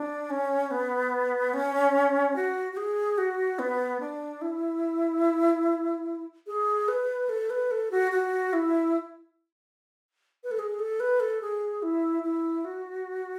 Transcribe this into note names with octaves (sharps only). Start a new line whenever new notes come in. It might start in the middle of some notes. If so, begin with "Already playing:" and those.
Already playing: D4
C#4
B3
C#4
F#4
F#4
G#4
F#4
B3
D4
E4
G#4
B4
A4
B4
A4
F#4
F#4
E4
B4
A4
G#4
A4
B4
A4
G#4
E4
E4
F#4